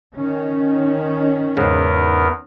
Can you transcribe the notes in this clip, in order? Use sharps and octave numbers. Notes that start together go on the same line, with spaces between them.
D#3 C#4
E2 G#2 C#3 B3 A#4